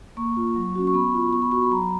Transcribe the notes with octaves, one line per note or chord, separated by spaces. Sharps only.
A#3 C#6
F4
F#3
C#4 F#4
C#6
B3 B5
F4
B3 C#6
B5
F#4 C#6
B5
F#3 A#5